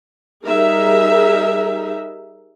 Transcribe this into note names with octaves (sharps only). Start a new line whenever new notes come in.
G3 D#4 G#4 A#4 E5